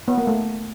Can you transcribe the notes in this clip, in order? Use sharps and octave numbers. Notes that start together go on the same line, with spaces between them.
B3
A#3
A3